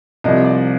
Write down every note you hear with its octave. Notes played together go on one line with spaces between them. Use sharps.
C2 C3 F3 D#5
D5